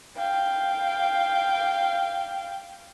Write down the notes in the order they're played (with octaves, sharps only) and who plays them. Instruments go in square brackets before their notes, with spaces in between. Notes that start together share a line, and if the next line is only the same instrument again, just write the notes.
[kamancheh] F5 G5